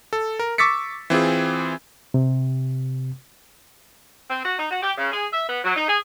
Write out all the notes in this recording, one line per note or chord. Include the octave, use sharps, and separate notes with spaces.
A4
A#4
C#6 D6 E6 A6 B6 C#7
E3 C4 F4 G#4
C3
C4
F#4
D#4
F#4
G4
C#3
G#4
E5
B3
F#3
D#4
G#4